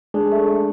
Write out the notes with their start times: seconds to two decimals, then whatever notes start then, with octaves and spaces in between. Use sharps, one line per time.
0.14 G#3 D4 G#4
0.31 A3
0.48 A3